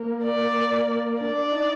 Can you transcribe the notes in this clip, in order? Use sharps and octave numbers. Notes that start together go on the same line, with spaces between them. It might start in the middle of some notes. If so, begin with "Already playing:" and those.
Already playing: A#3
D5
D4 D5
D#4